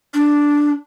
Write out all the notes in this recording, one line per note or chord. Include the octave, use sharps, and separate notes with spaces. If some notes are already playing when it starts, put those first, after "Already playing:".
D4